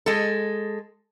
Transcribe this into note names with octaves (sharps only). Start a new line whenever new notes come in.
G#3 A4